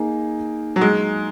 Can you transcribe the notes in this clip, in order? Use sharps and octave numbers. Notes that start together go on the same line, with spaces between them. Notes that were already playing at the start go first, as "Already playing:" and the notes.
Already playing: A#3 D#4 G#4
F#3
G#3